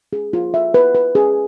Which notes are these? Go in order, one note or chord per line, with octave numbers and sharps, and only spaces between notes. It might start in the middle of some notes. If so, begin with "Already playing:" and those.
G#4
F4
E5
B4
B4
G#4